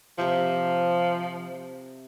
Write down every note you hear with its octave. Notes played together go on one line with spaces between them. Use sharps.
C3 F3 G4 E5